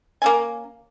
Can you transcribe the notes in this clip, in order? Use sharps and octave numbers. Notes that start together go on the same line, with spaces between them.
A#3 C#4 G#5